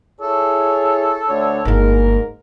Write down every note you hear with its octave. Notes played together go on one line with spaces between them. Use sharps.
E4 G#4 A4 C#5
D2 D3 C#5
G1 G#2 A#3 A#4